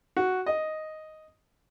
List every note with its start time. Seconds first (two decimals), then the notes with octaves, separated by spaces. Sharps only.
0.17 F#4
0.46 D#5